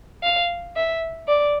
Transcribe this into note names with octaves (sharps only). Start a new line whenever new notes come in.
F5
E5
D5